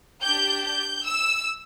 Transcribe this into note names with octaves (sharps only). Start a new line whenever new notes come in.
D4 G4 G6
G6
E6